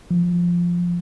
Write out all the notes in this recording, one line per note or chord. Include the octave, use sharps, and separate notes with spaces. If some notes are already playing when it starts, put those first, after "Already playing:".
F3